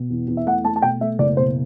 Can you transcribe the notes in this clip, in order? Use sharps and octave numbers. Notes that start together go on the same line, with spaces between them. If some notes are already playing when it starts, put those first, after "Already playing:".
Already playing: B2
E2
E2
E5
A3 F#5
A3 A5
A5
B2 G5
A3 E5
F#1 D5
B2 C5